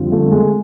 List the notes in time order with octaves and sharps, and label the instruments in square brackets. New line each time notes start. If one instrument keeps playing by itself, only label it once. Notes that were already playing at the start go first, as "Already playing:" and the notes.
Already playing: [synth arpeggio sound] F2 D3 G3 C4 F4
[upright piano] A3
G#3